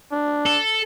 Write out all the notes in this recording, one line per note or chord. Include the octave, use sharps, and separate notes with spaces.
D4
A4